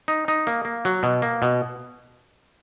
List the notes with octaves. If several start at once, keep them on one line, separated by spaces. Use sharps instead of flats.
D#4
D#4
A#3
A#3
F#3
B2
A#3
B2